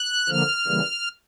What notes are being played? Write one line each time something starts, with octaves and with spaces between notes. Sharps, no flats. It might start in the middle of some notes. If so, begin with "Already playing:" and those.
Already playing: F#6
D3 F3 A#3 F6
C#3 E3 G3 A#3